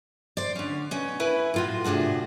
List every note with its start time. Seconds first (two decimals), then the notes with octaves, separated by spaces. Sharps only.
0.37 C5 D5
0.56 D3 C#4
0.91 B2 C#4
1.20 E4 B4 G#5
1.54 A2 F4 F#4
1.84 A2 C3 D4 F#4 G#4